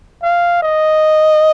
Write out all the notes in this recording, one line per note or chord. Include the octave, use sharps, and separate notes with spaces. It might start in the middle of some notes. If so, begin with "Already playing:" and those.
F5
D#5